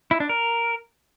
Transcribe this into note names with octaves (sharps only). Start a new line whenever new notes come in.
E4
D4
A#4